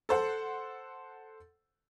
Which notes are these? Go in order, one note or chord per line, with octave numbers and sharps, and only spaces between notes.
A4 C5 F#5